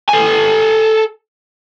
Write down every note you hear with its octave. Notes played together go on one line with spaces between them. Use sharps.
A4 G#5